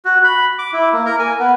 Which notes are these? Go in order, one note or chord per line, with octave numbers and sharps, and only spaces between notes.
F#4
B5
D6
E4
A#3
A#4
G#5
B3